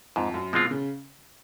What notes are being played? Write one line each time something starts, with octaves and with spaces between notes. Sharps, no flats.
F2 G#2
F#2
B2 F3 G#3 C4 F4
C#3